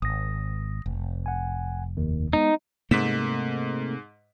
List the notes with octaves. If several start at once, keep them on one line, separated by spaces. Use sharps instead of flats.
G#1 D#6 A#6
F1
F#5 G#5
D#2 D#3
G#3 B3 D#4
G#2 C3 A3 A#3 B6 E7